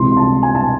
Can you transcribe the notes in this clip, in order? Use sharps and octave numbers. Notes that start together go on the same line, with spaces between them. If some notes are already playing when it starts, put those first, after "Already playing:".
Already playing: C#2 C3 E3 C6
C6
A5
G#5
A5